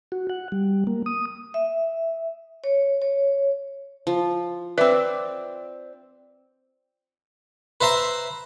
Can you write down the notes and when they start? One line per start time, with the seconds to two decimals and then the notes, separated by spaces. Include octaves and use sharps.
0.12 F#4
0.30 F#5
0.52 G3
0.87 A#3
1.06 D#6
1.54 E5
2.64 C#5
3.02 C#5
4.07 F3
4.78 C4 B4 D5 E5
7.81 B4 C5 E5 A#5 C6